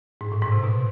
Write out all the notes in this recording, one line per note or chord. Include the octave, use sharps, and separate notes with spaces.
G#2
A2
G#2
C3
B2